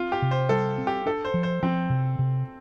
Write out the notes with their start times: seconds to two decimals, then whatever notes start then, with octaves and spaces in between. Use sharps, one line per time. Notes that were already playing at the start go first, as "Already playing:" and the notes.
Already playing: C4 F4
0.12 G4
0.22 C3
0.31 C5
0.49 G3 A4
0.78 C4
0.87 G4
1.06 D4 A4
1.25 C5
1.34 F3
1.43 C5
1.63 F3 C4
1.90 C3
2.19 C3